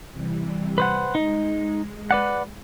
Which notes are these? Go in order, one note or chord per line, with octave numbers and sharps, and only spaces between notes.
C3 E3 G3
B4 C5 F#5
G#3 D#4
B4 D5 F#5